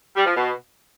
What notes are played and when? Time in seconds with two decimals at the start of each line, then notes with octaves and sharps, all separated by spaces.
0.15 G3
0.26 F3
0.36 B2